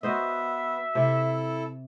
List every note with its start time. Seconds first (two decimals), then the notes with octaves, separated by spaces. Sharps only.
0.03 B3 F#4 C5 D#5 E5
0.95 C3 E4 A4